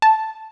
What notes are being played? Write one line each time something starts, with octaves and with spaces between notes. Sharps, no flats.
A5